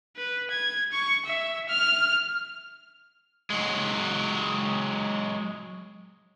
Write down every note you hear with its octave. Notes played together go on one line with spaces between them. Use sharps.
B4
G#6
C#6
E5
F6
F#3 G#3